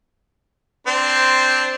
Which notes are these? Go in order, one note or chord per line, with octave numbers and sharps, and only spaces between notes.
C4 D4 C5